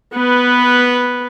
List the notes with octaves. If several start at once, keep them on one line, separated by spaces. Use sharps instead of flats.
B3 B4